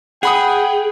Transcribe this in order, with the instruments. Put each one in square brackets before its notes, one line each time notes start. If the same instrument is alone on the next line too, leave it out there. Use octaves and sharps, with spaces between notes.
[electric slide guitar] G#4 [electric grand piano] F#5 B5 D#6 [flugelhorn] G5